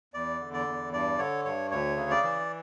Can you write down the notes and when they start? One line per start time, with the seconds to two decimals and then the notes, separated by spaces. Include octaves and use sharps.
0.14 E2 D5
0.40 D3
0.53 D5
0.67 E2
0.93 G2 D5
1.18 D3 C#5
1.45 G2 C#5
1.71 D2 C#5
1.97 C#3
2.11 D5
2.23 E3